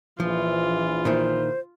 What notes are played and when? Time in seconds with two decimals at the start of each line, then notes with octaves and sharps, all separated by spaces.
0.20 A#1 E3 F3 F4
1.05 A#2 D#3 E4 C5